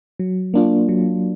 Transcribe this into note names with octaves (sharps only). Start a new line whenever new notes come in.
F#3
A#3 D4 F4
F#3